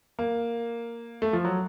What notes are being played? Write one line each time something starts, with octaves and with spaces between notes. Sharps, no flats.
A#3
A3
F3
F#3